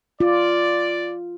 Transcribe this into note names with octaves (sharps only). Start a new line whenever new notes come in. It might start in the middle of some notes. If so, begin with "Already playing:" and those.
F4 D5